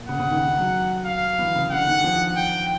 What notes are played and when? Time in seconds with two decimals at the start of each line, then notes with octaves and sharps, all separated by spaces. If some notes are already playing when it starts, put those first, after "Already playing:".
Already playing: A#2
0.09 C#3 F#5
0.20 C#3
0.31 D#3
0.58 F#3
1.06 F5
1.39 E3
1.55 C#3
1.71 D3 F#5
1.88 D#3
2.04 F3
2.37 G5